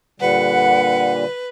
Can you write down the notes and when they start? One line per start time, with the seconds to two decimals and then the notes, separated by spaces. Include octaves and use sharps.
0.20 A#2 D3 G3 B4 F#5